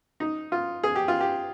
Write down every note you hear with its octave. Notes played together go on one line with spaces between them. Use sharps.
D#4
F4
G#4
G4
F4
G4